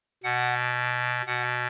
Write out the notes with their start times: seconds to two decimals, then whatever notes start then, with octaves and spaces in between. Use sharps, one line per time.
0.24 B2 F#5
1.26 B2 F#5